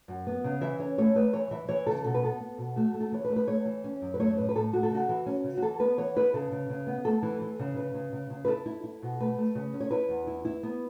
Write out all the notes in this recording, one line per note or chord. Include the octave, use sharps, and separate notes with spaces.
F#2
B3
C#3
E3 E5
C#4 C#5
A3 C#5
A3 B4
E3 C#5
E3 E5
E3 C#5
C#3 A4
B2 A4
B4
B3 A4
B3
B2
A3 F#4
A3
A4
E3 C#5
B4
A3
B4
A3 C#5
E3
C#4
F#2
B4
A3 C#5
A2 B4
B4
A2 A4
A3 F#4
A4
C#3 F#4
E3
C#4
C#3
F#4
E3 A4
B3 B4
E3 C#5
E4 B4
C#3 A4
C#3
C#3
B3
A3 A4
E3
E3
C#3
C#3 B4
C#3
C#3
C#3
B4
E4 A4
E4
E4
B2
A3 B4
A3
C#3
C#4
C#5
E4 B4
E2
E4
E4
B3